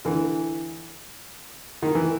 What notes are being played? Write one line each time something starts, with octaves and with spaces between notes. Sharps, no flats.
D3 E3
D#3
E3